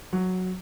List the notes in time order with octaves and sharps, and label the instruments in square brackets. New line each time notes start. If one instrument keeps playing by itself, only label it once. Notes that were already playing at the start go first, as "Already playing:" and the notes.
[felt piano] F#3